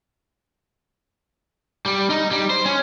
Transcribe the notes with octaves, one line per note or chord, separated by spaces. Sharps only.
G3
D#4
G3
C5
C#4